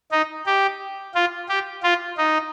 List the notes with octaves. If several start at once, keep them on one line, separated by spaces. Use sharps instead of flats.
D#4
G4
F4
G4
F4
D#4